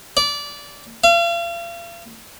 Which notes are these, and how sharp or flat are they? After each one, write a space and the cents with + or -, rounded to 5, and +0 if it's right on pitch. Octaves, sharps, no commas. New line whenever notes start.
D5 -20
F5 -40